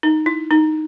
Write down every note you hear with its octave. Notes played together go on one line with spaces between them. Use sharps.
D#4
E4
D#4